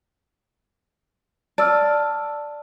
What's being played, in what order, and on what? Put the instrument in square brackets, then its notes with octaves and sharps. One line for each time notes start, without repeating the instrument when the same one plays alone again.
[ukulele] D5 [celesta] A5 E6 F6